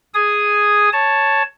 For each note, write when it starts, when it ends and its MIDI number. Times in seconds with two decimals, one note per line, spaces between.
0.14 0.89 68
0.14 0.89 80
0.14 0.89 87
0.93 1.43 73
0.93 1.43 81